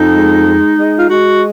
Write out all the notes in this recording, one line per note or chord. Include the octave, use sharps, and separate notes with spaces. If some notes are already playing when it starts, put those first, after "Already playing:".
Already playing: F2 D#4
G#3
G#3
G#3
F4
G#3 F#4